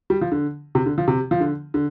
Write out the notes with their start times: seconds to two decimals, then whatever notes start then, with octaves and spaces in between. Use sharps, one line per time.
0.10 G3
0.21 F3
0.32 D3
0.75 C3
0.86 D3
0.98 F3
1.08 C3
1.31 F3
1.40 D3
1.74 D3